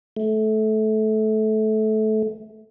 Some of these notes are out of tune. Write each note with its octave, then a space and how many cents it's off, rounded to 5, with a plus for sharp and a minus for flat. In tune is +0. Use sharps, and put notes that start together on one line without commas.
A3 -20